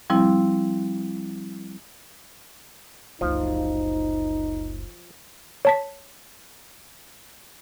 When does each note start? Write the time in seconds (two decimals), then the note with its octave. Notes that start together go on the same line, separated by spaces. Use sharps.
0.10 F3 G3 C4 E4
3.21 F#1 C#2 F3 D#4
5.65 C#5 A5 B6